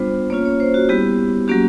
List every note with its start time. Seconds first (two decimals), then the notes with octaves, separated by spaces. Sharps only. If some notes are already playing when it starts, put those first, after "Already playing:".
Already playing: G3 B3 D4 F4 C5
0.30 A#3 C#4 F4 C#5
0.45 C#5
0.60 C5
0.74 F#4
0.89 G3 B3 E4 G4
1.48 F#3 A#3 C#4 F#4 G4